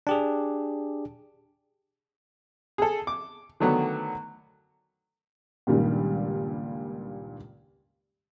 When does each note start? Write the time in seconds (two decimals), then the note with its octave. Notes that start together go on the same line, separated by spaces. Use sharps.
0.07 D4 G4 G#4
2.78 G#4 A4
3.07 D6
3.60 D3 D#3 F#3 A3 B3 F#4
5.67 C#2 G2 A#2 D#3 G3